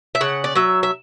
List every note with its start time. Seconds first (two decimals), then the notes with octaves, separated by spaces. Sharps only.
0.15 E5
0.21 C#3 F#5
0.44 D5
0.55 F#3 E5
0.83 E5